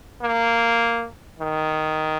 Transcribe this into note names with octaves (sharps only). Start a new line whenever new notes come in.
A#3
D#3